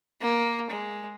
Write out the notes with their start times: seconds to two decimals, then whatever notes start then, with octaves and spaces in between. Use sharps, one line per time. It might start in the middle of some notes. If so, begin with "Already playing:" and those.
0.21 A#3
0.70 G#3